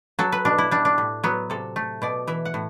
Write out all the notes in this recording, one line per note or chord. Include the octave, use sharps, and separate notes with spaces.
F#3 A4
B4
B2 D4
E4
G3 D4
D4
A2
F#3 B3
C3 A4
A3
B2 D5
E3 E5
F#5
A2